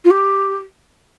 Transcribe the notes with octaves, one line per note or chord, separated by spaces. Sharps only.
F4
G4